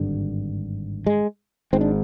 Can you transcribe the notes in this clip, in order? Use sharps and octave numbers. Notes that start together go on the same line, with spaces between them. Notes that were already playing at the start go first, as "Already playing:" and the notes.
Already playing: G#1 G2 D3
G#3
G#1 G#2 C4
D4